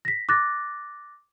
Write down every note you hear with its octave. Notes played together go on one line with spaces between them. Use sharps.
A#6 B6
D6 F#6 A6 A#6